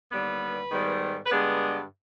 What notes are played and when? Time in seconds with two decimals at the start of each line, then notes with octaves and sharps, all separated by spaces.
0.10 D#2 D3 G3 B3 B4
0.71 G#2 D#3 G3 B3
1.26 B4
1.31 G2 D3 G#3 B3 G#4